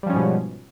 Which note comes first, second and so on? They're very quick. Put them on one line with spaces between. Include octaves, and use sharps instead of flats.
G3 F3 C#4 G#2 B2